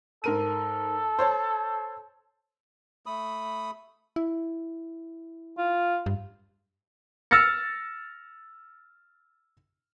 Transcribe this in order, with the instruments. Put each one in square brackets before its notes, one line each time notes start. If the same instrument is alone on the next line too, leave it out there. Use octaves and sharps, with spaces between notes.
[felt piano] G#2 A#4 D#7 [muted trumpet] A4
[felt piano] C5 C#5 A5
[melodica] A3 B5 D#6
[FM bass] E4
[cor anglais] F4
[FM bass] G2
[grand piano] E6 F6 A6 A#6 C#7